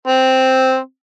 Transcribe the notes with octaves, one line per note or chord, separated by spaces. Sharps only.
C4